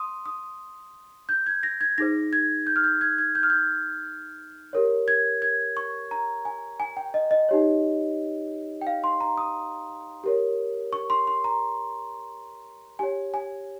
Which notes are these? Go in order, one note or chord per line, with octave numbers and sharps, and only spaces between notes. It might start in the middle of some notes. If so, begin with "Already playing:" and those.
Already playing: C6 D#6
D#6
G6
G#6
A#6
G#6
D#4 G#4 C5 A#6
G#6
G6
F6
G6
G#6
G#6
G6
F6
G6
G4 A#4 C#5
G#6
G#6
C#6
A#5
G#5
G#5
G5
D#5
D#5
D#4 G4 C#5
G5
F5
C6
A#5
D#6
G4 A#4 C#5
C#6
C6
C6
A#5
G4 C#5 G#5
G#5